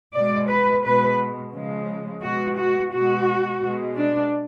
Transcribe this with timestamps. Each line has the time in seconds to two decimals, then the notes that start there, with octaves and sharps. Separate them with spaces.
0.14 B2 G#3 D5
0.49 B4
0.84 B2 G#3 B4
1.54 C#3 F3 G#3
2.22 B2 G#3 F#4
2.58 F#4
2.93 B2 G#3 F#4
3.61 B2 G#3
3.96 D4